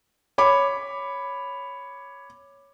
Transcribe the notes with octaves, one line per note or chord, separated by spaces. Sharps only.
C#5 B5 D6